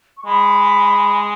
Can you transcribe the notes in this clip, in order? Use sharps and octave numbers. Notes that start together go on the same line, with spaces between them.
C#6
G#3 B5